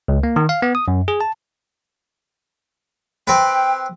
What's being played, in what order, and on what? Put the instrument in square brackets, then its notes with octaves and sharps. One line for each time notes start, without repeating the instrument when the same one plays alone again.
[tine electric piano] C#2
A#3
D#3
F5
B3
D#6
F#2
G#4
A5
[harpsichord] C4 B4 [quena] G5